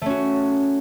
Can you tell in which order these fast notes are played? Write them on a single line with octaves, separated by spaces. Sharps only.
A3 C#4 F#4